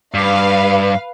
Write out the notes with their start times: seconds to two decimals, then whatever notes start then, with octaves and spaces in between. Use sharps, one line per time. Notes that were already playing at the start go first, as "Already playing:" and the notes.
0.14 G2 B4 F5